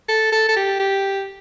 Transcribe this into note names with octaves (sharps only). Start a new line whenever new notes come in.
A4
A4
A4
G4
G4